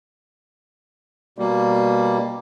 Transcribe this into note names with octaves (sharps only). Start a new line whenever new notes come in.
B2 G3 A#3